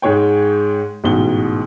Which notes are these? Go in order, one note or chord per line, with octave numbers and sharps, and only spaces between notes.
G#2 G#3 C#5 G5
A1 G#2 B2 G7